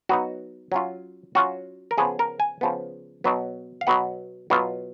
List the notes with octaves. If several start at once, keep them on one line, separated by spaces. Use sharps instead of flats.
F#3 B3 D#4 F#4
F#3 C#4 F4
F#3 C#4 F4 F#4
A#4
C#3 F3 B3 G#4
A#4
G#5
C#3 F3 B3
B2 F#3 B3
F5
B2 F#3 B3 F#5
B2 F#3 B3 F4